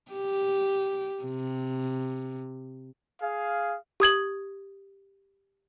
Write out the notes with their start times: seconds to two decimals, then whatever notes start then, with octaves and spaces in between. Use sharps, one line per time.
0.12 G4
1.23 C3
3.21 G#4 F5
4.00 G4 D#6 G#6 F#7